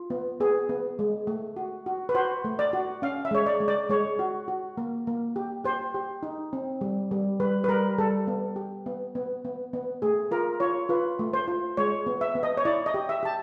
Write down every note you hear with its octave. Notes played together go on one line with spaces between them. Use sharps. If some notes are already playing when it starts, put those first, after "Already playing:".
Already playing: F4
B3
B3 G#4
B3
G#3
A3
F#4
F#4
B4
F#4 C5
A3
D5
F#4
C#4 F5
E5
G#3 C#5
D5
G#3
D5
G#3 C#5
F#4
F#4
A#3
A#3
G4
G4 C5
G4
D#4
C4
G3
G3
G3 B4
B4
G3 A#4
G3 A4
B3
G4
B3
B3
B3
B3
A3 G#4
F4 A#4
F4 C#5
F4 B4
A3
C5
F4
G#3 C#5
B3
E5
B3
D#5
C#5
E4 D5
D#5
G4
E5
G4 A5